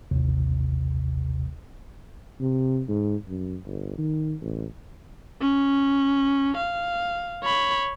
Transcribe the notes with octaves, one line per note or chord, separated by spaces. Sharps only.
A1 D#2 C3
C3
G#2
F#2
G1
D#3
A1
C#4
F5
C#5 B5